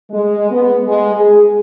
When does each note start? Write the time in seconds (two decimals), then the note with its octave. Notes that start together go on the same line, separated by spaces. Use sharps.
0.12 G#3
0.51 B3
0.86 G#3
1.15 G#4